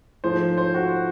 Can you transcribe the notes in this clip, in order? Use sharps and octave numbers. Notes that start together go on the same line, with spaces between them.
G#2 F3 A3 C5
C5
F#4